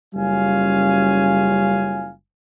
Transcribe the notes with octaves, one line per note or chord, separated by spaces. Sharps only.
F#1 G3 C#4 F4 F5 G#5